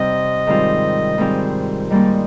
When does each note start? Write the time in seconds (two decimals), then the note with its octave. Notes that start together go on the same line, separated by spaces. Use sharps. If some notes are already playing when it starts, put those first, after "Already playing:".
Already playing: C3 G3 C4 D#4 D#5
0.47 G#2 D#3 G3 C4 F4
1.18 G#2 D#3 G3 C4 F4
1.90 G#2 G3 A#3 D#4 D5